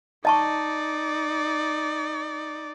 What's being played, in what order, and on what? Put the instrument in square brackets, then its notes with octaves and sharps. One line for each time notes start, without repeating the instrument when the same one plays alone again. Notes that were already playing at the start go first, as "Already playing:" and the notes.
[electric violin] D#4 D5 [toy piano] D#5 A5 C#6